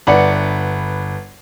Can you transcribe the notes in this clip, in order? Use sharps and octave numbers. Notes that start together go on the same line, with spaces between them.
G1 B4 D5 F#5 C#7